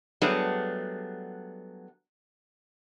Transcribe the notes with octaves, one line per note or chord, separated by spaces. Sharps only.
F#3 G3 A3 B3 D4 G#4